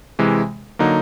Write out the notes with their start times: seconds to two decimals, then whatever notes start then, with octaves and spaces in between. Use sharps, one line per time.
0.19 C3 E3 G#3
0.79 D3 F#3 A#3 D#4